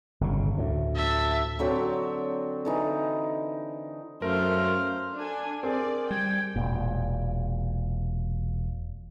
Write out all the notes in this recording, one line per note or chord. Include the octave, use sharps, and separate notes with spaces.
G1 A#2 C#3
D2 A2
E5 A5
D3 F#3 C4 G5
D3 E3 D#4
F#2 A3 A#4 C5 F5
D4 A4 G#5
C4 G#4 A#4 D5
G3 G5 G#6
E1 A#2